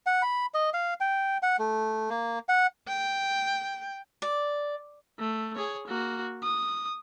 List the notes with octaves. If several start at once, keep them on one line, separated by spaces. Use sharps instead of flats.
F#5
B5
D#5
F5
G5
F#5
A3
A#3
F#5
G5
D5
A3
G#4 C#5
A#3 F#4
D#6